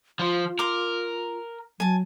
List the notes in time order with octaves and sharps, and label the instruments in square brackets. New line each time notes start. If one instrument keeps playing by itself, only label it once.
[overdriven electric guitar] F3 [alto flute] F4
[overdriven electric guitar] A#4 [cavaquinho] C6 D6
[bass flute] F#3 [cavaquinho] G#5 A5